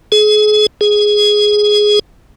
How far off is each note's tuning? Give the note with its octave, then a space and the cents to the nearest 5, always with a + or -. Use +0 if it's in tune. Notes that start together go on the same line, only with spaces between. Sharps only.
G#4 +35
G#4 +5